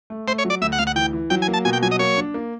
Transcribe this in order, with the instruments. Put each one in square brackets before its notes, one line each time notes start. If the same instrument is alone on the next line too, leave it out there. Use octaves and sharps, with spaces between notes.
[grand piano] A3
[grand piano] A3 [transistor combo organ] C5
[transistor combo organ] C#5
[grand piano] F#3
[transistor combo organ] D5
[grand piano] D2 [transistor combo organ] E5
[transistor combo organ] F#5
[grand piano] D2 [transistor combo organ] F5
[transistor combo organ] F#5
[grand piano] E3 [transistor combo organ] G5
[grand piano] E3
[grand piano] F#3 [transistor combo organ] G5
[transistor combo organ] G#5
[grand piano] A#3
[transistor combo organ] A5
[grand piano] B2 [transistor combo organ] G#5
[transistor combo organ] G5
[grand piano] F#3 [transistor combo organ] G#5
[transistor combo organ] D#5
[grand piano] A#3 [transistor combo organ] C#5
[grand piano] D4
A#3